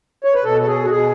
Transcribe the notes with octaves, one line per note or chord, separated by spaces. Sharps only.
C#5
B4
B2 A4
A4
G#4
F#4
B2 G#4